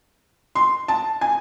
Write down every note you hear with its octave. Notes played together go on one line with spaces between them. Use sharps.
C6
A5
G#5